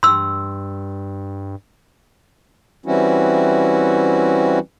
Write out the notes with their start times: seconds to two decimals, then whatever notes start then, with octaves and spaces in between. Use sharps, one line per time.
0.03 G2 C6 E6
2.86 E3 G3 C4 C#4 E4 F#4